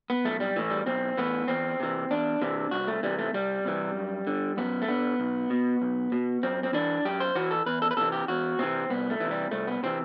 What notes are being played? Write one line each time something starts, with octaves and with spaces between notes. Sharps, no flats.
B3
B1 A3
G3
A2 E3
G3
B1 C4
A2 E3 B3
E2 C4
C3 E3
E2 D4
C3 E3
C2 F#4
A3
C3 E3 G3
A3
C2 G3
C3 E3
F#2
D3
F#2 B3
A3
D3 B3
B1
B2
B1
B2
F#2 C4
C4
E3 D4
F#2 G4
C5
E3 F#4
A4
E2 B4
A4
B4
C3 E3 A4
G4
E2 F#4
C3 E3 C4
C2 B3
A3
C3 E3
G3
C2 A3
B3
C3 E3 C4